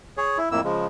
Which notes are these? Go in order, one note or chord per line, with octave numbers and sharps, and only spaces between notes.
G#4 C#5
E4
F2 A2 A#3 E4 E6
C#3 F3 G#3